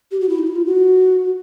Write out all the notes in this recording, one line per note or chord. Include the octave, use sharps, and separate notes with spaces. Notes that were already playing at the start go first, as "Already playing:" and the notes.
G4
F#4
E4
D#4
E4
F4
F#4